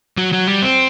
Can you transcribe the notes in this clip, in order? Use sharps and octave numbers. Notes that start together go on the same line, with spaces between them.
F#3
F#3
G3
C4